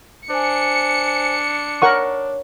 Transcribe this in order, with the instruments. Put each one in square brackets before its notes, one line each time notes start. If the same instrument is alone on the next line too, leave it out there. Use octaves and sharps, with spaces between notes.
[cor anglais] D4 [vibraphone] C5 G#5 [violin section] C#7
[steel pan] A#4 F#5 C#6 [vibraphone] C#5